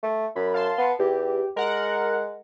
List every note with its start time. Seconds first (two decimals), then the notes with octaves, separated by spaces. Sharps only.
0.03 A3
0.36 F#2 B5
0.54 F5 A5 C6
0.78 B3
0.99 E2 G4
1.56 G#3 A#4 F#5